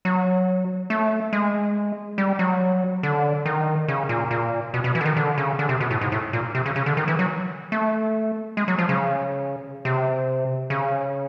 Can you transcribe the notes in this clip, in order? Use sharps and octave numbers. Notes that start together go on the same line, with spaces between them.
F#3
A3
G#3
G3
F#3
D3
D#3
C#3
A#2
A#2
B2
B2
E3
D3
D#3
D3
C#3
D3
C3
B2
A2
G#2
A2
A#2
C3
C#3
C#3
D3
D#3
E3
F#3
A3
G#3
F#3
F3
C#3
C3
C#3